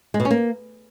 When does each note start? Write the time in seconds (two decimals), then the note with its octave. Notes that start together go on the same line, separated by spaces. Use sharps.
0.14 G#3
0.20 B2
0.25 C#4
0.31 A#3